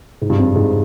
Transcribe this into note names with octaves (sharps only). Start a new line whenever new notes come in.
G#2
G2
F2
G#2